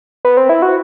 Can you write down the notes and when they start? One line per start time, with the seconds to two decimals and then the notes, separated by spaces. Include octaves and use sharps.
0.25 B3
0.37 C4
0.49 E4
0.62 F#4